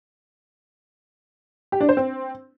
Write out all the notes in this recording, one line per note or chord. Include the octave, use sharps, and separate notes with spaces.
G4
D4
C5
C4